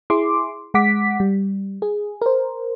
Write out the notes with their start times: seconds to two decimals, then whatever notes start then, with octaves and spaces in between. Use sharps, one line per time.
0.10 E4 G#4 C6 D6
0.74 G#3 F#5 D6 B6
1.20 G3
1.82 G#4
2.22 A#4 C5